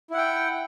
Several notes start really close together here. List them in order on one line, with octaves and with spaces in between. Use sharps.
E4 F#5 G5